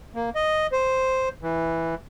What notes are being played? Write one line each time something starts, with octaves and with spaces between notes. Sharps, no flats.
A#3
D#5
C5
E3